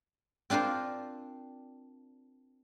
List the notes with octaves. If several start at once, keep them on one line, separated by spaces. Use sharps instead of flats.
C4 D4 F4 A#4 C5